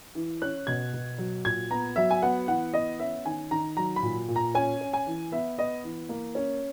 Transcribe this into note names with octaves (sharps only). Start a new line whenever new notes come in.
E3
C#4 F#6
B2 G#6
B2
F#3
A#2 G#6
B3 A#5
F#3 E5
G#5
B3 F#5
E3 F#5
B3 D#5
C#4 E5
D#3 G#5
D#3 A#5
F#3 A#5
B5
A#2
A#2
A#5
C#4 G#5
C#4
G#5
E3
B3 E5
B3 D#5
E3
A#3
C#4